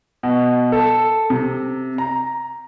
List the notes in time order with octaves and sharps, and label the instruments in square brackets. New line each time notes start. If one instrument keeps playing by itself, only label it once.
[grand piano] B2
A4
C3
A#5